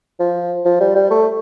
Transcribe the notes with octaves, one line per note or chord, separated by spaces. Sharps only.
F3
F3
G3
G3
A3